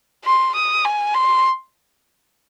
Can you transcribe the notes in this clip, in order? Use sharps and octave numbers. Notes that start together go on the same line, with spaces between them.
C6
D#6
G#5
C6